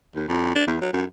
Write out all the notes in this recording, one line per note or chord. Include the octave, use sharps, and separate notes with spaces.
D#2
F2
D4
E2
F#3
F#2